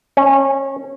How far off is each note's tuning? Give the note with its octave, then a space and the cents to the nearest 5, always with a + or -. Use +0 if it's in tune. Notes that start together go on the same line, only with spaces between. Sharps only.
C#4 -25